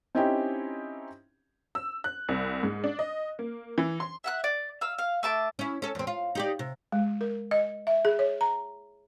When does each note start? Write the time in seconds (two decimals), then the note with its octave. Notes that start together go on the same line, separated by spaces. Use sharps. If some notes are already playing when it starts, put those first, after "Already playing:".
0.15 C4 C#4 D#4 E4 G4
1.75 E6
2.04 F#6
2.29 C2
2.63 G#2
2.84 D4
2.99 D#5
3.39 A#3
3.78 E3
4.00 C6
4.24 E5 F#5 F#6
4.44 D5
4.81 F5 E6
4.98 F5
5.23 A3 A5 D6
5.59 C#4 E4
5.82 C#4 A4
5.95 E2 C4
6.07 F4
6.35 D#4 G4 D5
6.59 C3
6.92 G#3
7.21 A#4
7.51 D#5
7.87 E5
8.05 G#4
8.19 C#5
8.41 A#5